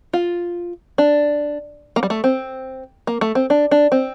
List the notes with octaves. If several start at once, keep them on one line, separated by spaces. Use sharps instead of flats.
F4
D4
A#3
G3
A3
C4
A#3
A3
C4
D4
D4
C4